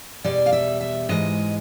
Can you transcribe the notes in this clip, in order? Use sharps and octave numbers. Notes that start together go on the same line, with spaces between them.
E2 B2 G3 D5
F5
E5
E5
G#2 E3 G#3 D#5